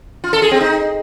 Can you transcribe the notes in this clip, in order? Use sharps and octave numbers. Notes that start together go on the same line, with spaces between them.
F4
A4
G#4
C4
D#4